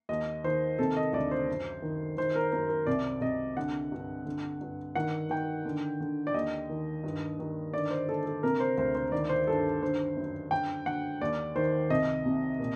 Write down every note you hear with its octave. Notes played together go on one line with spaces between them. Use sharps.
D#2 D#5
D#3 C5
C3 A4
D#5
D2 D5
C5
F#2
D#3
D#3 C5
A#4
F#2 A#4
A#4
C2 D5
C2 D#5
D3 F#5
G2
D3
G2
D#3 F#5
D#3 G5
D3
D3
D5
D#2 D#5
D#3
G2
D#3
D3 D5
C5
D3 A4
A4
C3 A#4
C5
D2 C5
C5
D#3 D5
C5
G2 A4
D3 C5
F#2
D3 G5
D3 F#5
D#2 D5
D#3 C5
C2 D#5
C3
A#2